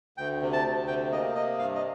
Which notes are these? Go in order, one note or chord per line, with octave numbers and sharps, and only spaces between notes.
D2 G5
C3
A5
D2
C3 G5
A#3 D#5
C3 D#5
G2 F5
D#5